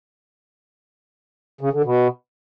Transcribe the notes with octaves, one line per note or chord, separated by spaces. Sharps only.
C#3
D3
B2